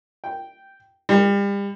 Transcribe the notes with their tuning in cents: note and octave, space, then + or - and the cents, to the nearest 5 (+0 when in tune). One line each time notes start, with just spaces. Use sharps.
G5 -5
G3 +35